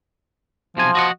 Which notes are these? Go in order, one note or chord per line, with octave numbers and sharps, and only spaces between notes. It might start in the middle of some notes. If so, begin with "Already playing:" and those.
B1 C3 F3 G#5
F#4 D#5 F#5